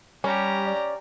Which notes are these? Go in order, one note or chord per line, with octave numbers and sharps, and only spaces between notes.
G3 C#4 G4 A#5
D5